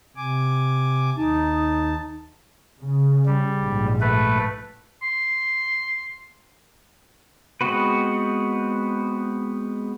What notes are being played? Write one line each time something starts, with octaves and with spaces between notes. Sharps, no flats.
C3 G#5 D6
D#2 D#4 A5
C#3
G3
A#1 G#2
A3 B4
C6
G#3 B3 C4 F#4 B4